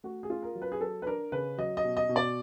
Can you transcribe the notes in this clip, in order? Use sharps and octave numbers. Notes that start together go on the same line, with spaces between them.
A3 F#4
G#4
F4
A#4
F#3
B4
G#4
F#3 A4
B4
D4 A#4
C#3 B4
F#3 D#5
D#5
B2
D#5
B2
D5